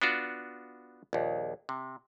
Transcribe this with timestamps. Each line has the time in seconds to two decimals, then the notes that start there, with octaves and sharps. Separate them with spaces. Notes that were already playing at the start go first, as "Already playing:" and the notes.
0.02 B3 D4 F4 F#4
1.13 A#1 D#2
1.69 C3